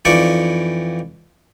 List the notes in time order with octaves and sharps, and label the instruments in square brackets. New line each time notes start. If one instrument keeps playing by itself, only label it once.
[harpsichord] F2 E3 D#4 D5 C#6